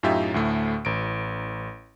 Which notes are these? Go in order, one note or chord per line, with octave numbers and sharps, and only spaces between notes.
F#2 A2 D#4 F4 G4 E5
D2 A2 A3
A1 D7